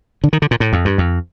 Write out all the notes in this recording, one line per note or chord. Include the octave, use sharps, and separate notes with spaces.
D3
D#3
D3
A#2
A2
F2
G2
F2